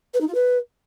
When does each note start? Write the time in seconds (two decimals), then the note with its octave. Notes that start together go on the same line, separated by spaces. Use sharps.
0.13 B4
0.20 D#4
0.27 F4
0.34 B4